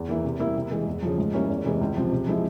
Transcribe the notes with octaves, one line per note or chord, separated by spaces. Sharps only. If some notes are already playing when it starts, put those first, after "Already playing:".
Already playing: E2
E3 A#3 E4
C3
G3 A#3 E4
C3
E3 G#3
E2
C#3 F3
G#2
G3 A#3 C#4 E4
E2
C3 E3 G#3 E4
C#2
C3 F3 C4
C3
F3 G#3 C4 E4